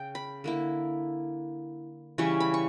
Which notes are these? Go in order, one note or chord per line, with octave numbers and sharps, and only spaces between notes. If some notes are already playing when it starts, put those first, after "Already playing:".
Already playing: C#3 G5
B5
D3 A#3 E4
C#3 E3 G3 C#4 C#6
B5
C#6